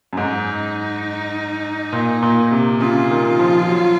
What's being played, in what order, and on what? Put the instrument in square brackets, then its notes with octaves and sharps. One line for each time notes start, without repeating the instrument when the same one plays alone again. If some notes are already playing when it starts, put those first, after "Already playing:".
[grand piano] F#2
[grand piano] G#2 [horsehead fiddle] D#4
[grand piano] A#2
A#2
C3
[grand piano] C#3 [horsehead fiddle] F4
[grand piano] D#3
F3
F#3